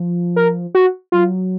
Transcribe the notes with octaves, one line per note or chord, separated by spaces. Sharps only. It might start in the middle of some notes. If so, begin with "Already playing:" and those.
Already playing: F3
A#4
F#4
F#3 F4